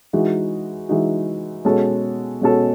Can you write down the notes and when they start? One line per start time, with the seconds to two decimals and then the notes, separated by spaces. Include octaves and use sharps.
0.13 E3 G#3 D#4 F#4
0.89 E3 G#3 D#4 F#4
1.65 B2 G#3 C#4 F#4 A4
2.41 B2 G#3 C#4 F#4 A4